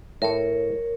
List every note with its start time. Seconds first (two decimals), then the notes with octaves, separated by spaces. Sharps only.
0.22 A2 A#4 C#5